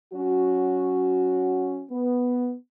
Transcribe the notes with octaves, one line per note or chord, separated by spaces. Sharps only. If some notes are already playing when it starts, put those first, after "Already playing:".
F#3 C#4 F#4
B3